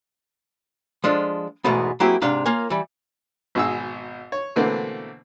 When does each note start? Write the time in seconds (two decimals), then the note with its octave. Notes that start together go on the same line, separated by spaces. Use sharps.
1.04 F3 G#3 D4 F4 A4
1.64 E2 G#2 B2 A3 B3
2.00 F#3 A#3 C4 E4 G4 G#4
2.22 G#2 C3 D4 F5 C6
2.46 A#3 F4 C#5 G#5
2.70 E3 G3
3.55 G#1 B2 G#4 E6
4.32 C#5
4.56 B2 D3 E3 A3 A#3 C4